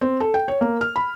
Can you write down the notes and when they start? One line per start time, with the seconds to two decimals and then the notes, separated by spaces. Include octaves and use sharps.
0.01 C4
0.20 A4
0.34 G5
0.48 C#5
0.61 A#3
0.81 F6
0.96 B5